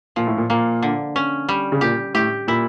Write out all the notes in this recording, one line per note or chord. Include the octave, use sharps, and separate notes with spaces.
A#2 F3
A2
A#2
A#2 A#3
D3
C#4
G3
C#3
A#2 G4
A2 G4
A#2 E4